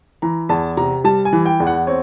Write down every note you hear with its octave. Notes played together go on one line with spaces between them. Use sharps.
E3 A#5
E2 A5
C3 A#5
G3 A5
G#5
E3
G5
E2
F#5
C4 C#5